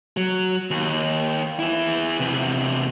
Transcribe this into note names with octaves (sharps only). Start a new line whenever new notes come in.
F#3
D#2
E2 E4
E2 C3